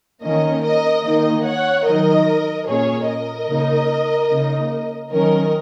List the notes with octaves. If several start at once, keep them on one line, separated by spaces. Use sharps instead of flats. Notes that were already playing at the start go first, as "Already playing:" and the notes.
D#3 A#3 C#4 A#4 D#5
A#4 D#5
D#3 A#3 D#4 A#4 D#5
C#5 F#5
D#3 F#3 D#4 A#4 D#5
A#2 A#3 C#4 G#4 C#5
A#4 D#5
C#3 A#3 D#4
C#3 A#3 D#4
D#3 F#3 C#4 A#4 D#5